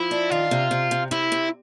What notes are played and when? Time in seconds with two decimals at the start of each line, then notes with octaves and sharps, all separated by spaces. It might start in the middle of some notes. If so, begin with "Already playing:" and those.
Already playing: F3 E4
0.11 D4
0.30 D#3 F4
0.51 C3
0.71 C3
0.91 C3
1.11 C3 E4
1.32 C3